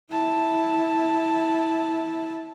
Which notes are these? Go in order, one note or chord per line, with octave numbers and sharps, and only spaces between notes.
E4 A5